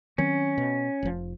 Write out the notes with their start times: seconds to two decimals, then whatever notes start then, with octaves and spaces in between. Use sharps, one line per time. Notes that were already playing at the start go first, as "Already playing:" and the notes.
0.18 D#3 F#3 C4 C#4
0.58 B2
1.03 F1 F3